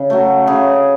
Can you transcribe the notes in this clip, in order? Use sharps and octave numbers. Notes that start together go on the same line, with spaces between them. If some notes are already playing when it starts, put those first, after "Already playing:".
Already playing: C#3
F#3 A3
C#3 G#4